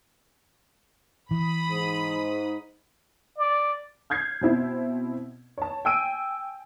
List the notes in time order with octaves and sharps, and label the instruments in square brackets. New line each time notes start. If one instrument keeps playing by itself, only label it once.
[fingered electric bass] E3 [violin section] B5 D#6
[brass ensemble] G#2
[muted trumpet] D5
[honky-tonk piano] F6 G6 G#6 C7
B2 C4 E4
C#5 A5
G5 G#5 E6 D7 D#7